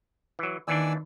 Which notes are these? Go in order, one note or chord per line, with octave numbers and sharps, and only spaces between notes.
E3 F#3
D#2 D#3 E3 D4 D5 G#5 E6